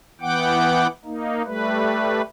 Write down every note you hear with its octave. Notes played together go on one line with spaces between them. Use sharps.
E3 B3 F#5 G5 D6
A#3 D#4
G3 A3 B4